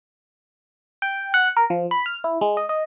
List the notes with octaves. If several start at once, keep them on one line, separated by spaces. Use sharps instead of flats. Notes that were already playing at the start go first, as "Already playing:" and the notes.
G5
F#5
A#4
F3
B5
F6
E4
G#3
D#5
D#5